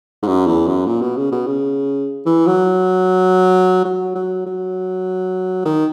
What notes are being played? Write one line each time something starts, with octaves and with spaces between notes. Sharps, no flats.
G#2
F#2
E2
F#2
A#2
B2
C#3
B2
C#3
E3
F#3
F#3
F#3
F#3
D#3